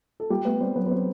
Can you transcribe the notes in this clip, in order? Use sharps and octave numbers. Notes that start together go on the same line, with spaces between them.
A4
G3 G4
A3 B3 B4
G3 C4 C5
F#3 B3 B4
B4
C4 C5